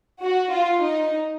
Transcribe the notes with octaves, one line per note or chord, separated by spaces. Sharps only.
F#4
F4
D#4